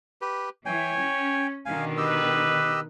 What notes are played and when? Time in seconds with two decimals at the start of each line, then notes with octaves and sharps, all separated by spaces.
0.21 G4 B4
0.66 E3 C#5 G5 G#5
0.98 C#4
1.66 B2 D3 D#3 F5 G#5
1.97 G4 B4 D#5 E6